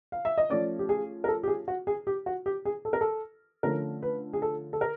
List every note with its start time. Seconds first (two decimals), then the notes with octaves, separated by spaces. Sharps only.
0.12 F5
0.25 E5
0.38 D#5
0.50 F3 A3 C#4 D5
0.79 G4
0.89 G#4
1.24 A#4
1.28 A4
1.43 G4
1.48 G#4
1.68 F#4
1.87 G#4
2.07 G4
2.26 F#4
2.46 G4
2.65 G#4
2.85 A4
2.93 A#4
3.01 A4
3.63 D3 F3 A3 C#4 A#4
4.03 B4
4.33 G#4
4.42 A4
4.73 A4
4.81 A#4